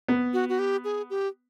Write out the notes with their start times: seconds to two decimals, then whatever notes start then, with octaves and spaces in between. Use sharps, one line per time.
0.08 B3
0.33 F#4
0.49 F#4
0.59 G4
0.84 G#4
1.10 G4